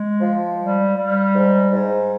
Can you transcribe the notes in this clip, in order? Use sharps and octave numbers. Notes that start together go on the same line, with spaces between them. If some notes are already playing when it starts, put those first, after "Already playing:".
Already playing: G#3
F3
G3
G3
G#2
G#2